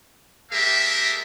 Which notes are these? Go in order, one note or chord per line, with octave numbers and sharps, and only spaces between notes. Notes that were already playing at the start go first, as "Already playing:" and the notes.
G#3 A#3 G4 A4 A#4 E5